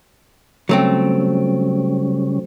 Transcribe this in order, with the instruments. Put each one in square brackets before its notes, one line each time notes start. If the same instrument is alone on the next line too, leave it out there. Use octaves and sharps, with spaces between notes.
[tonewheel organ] C#3 G3 C#4 [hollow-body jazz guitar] F#3 A3 C4